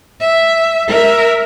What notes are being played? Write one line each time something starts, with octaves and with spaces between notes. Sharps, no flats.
E5
A#4 E5